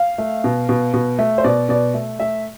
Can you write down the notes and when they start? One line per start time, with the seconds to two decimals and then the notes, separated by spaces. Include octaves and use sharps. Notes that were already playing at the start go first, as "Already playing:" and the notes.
Already playing: F5
0.18 A3
0.44 B2
0.69 B2
0.94 B2
1.19 A3
1.38 C5
1.44 B2 D5
1.69 B2 D5
1.94 A3
2.20 A3 E5